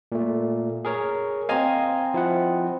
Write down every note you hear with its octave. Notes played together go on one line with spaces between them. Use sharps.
A#2 A3
G#4 A#4 C#5
C4 D#5 F5 G#5 A#5
F3 E4 F#5